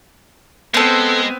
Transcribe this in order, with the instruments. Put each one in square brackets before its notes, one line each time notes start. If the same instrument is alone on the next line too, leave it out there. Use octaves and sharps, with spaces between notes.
[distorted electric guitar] G#3 [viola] B3 C4 [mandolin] A4 C5